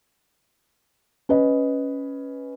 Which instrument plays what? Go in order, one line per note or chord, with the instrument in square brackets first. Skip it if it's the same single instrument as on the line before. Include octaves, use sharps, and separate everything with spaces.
[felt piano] C#4 B4 D#5